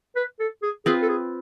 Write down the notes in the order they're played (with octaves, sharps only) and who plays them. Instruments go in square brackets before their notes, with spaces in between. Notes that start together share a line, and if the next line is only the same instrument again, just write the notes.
[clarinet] B4
A4
G#4
[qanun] C4 F4 B4 [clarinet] G#4
[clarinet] A4
G#4